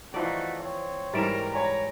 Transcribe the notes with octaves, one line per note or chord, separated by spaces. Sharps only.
E3 F3 A3 D#4 F#4 D5
C4 C#5
G#2 E3 G3 A#4 A6 D7 E7
C#5 G#5 A#5 B5